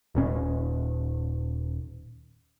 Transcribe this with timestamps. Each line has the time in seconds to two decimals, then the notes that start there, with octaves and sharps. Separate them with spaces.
0.15 D#1 A#2 C#4